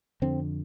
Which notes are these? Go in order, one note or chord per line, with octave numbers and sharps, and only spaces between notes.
F2 D3 C4